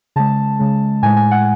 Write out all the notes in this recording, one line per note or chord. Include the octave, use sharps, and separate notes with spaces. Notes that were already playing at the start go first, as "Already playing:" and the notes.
C#3 G#3 A5
C#3 G#3
A2 G#3 G#5
G#5
F#5